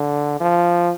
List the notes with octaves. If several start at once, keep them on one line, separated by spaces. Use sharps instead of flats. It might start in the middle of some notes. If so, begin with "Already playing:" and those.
Already playing: D3
F3